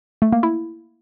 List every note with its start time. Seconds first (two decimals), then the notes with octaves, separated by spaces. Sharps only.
0.22 A3
0.32 A#3
0.43 E4